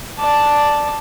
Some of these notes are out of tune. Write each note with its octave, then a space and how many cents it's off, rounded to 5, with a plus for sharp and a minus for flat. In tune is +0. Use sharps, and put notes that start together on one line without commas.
D5 +0 A5 +0